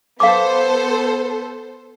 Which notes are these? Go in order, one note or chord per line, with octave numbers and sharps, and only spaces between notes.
B3 A4 C5 F5 D6